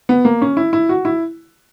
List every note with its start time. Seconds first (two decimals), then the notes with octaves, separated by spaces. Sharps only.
0.09 B3
0.25 A#3
0.42 C#4
0.57 E4
0.73 E4
0.89 F#4
1.05 E4